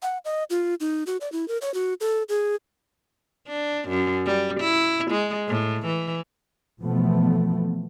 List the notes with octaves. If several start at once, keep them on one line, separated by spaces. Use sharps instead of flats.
F#5
D#5
F4
D#4
F#4
D5
E4
A#4
C#5
F#4
A4
G#4
D4
F#2
G3
E4
G#3
A2
E3
B2 E3 F3 A3 B3